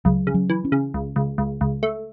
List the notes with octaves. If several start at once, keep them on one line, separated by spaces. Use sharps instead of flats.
C#2 F#3
C#3
F#3
E3
C#4
C#3
C#2
C#2
C#2
C#2
A3